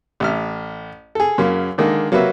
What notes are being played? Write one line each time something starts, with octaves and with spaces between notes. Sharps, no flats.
A1 E5 F6
G#4 A4
F#2 C#3 A#3
D3 D#3 G#3 A#3
F#3 A#3 F#4 B4 E5